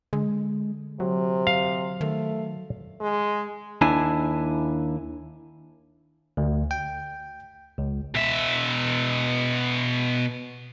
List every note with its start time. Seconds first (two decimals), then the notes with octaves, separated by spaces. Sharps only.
0.13 D3 G#3
1.00 C3 F#3
1.47 F5
2.01 D#3 A3
3.01 G#3
3.81 D#2 D4 E4 G#5
6.37 D2
6.71 G5
7.78 C#2
8.15 B2 E5